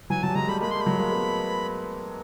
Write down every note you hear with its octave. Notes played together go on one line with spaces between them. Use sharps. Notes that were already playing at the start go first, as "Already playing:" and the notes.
E3 F#3 G#5
E3 F#3 A5
G3
F#3 G#3 A#5
G3 A3 B5
G#3 A#3 B5
G3 A3 C6
B5
F#3 G#3
G#3 A#3
A3 B3